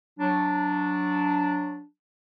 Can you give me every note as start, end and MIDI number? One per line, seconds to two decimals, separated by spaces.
0.20 1.84 54
0.20 1.84 62